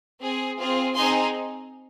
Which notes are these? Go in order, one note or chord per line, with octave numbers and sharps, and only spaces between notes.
C4 G#4
C4 F4 G#4
C4 D#4 G#4 G#5 C6